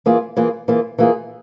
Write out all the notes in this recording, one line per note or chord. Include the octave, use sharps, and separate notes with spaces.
E3 A#3 F4 G#4
E3 A#3 F4 G#4
E3 A#3 F4 G#4
E3 A#3 F4 G#4